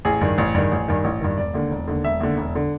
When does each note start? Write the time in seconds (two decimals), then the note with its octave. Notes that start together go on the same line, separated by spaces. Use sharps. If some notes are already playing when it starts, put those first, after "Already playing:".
0.05 A1 G#4
0.21 G2 D#3
0.38 A1
0.55 G2 D#3
0.71 A1
0.88 G2 D#3
1.04 A1
1.21 G2 D#3
1.37 E1 D5
1.54 D#2 D3
1.71 E1
1.88 D#2 D3
2.04 E1 E5
2.20 D#2 D3
2.37 E1
2.55 D3